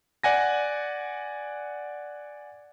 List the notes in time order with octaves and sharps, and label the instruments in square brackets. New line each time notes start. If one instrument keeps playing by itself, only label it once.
[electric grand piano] D5 F#5 G#5 A#6